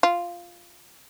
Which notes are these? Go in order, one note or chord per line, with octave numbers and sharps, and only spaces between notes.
F4